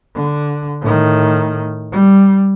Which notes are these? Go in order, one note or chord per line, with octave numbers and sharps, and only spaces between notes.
D3
A2 D#3
G3